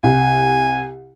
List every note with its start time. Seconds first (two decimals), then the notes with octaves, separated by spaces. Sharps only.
0.03 C2 G#5